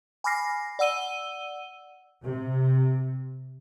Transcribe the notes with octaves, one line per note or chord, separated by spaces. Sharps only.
G#5 B5 D6 F6 A#6 C7
D5 F#5 E6 D#7 G7
C3